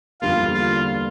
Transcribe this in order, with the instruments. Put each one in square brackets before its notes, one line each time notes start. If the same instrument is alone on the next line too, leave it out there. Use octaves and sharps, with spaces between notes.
[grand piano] E2 D3 G3 A#3 [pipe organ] F4
[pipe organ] F4